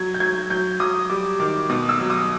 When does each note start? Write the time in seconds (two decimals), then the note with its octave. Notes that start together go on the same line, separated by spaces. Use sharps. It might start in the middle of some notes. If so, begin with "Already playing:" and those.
Already playing: F#3 G#6
0.14 G6
0.20 F#3 G#6
0.50 F#3 G6
0.80 F#3 D#6
1.10 G3 D6
1.40 D#3 D6
1.70 B2 D#6
1.89 E6
2.00 F#3
2.10 D#6